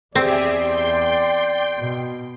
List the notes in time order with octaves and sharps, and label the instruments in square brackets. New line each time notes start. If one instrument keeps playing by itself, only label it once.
[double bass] E2 [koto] C4 [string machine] G4 G#4 E5 [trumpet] D5
[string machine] G5 C6
[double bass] B2